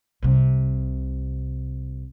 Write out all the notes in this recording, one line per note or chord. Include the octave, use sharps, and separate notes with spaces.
C2 C3